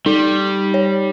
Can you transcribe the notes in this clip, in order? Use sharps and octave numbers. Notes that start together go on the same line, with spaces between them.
G3 D#4
C#5